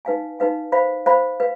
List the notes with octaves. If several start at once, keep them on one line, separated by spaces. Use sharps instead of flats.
D#4 B4 F5 G#5
D#4 B4 F5 G#5
C5 F5 B5
C5 F5 B5
B4 F5